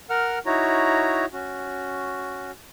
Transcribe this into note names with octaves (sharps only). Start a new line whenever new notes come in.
A#4 F#5 F6
D#4 E4 F#4 C#5 A#5
C#4 F#4